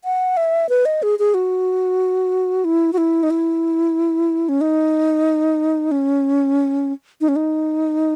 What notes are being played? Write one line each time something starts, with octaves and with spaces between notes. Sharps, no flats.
F#5
E5
B4
D#5
G#4
G#4
F#4
E4
F#4
E4
D#4
E4
C#4
D#4
C#4
D#4
C#4
D#4